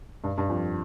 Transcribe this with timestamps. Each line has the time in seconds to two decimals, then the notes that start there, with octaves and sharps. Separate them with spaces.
0.24 G2
0.38 G2
0.50 F2